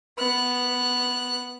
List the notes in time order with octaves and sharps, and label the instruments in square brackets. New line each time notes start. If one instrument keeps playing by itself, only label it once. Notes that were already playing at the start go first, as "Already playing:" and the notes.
[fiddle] B3 F#6